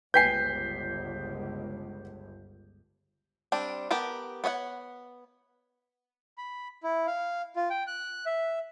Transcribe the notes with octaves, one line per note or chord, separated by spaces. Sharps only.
G1 C#2 B4 G5 G#5 G6 B6 C7
G3 C4 D4
B3 G4 A#4 A5
B3 C#5 D#5 F#5
B5
E4
F5
F4
G5
F#6
E5